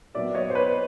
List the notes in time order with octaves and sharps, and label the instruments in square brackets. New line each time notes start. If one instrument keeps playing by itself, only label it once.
[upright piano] A#2 F#3 B3 D5 E5
C#5 D#5
C5
B4 C#5